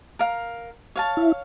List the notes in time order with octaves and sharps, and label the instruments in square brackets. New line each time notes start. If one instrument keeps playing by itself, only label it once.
[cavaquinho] A#4 F5
C#5 F5 A5
[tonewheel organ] E4